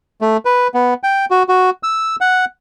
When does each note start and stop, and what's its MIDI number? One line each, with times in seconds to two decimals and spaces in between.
0.21 0.37 57
0.45 0.68 71
0.74 0.94 59
1.03 1.25 79
1.30 1.43 66
1.49 1.70 66
1.83 2.16 88
2.21 2.45 78